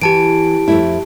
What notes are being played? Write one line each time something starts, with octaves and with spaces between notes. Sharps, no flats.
E3 G4 A5 D7
F2 A3 E4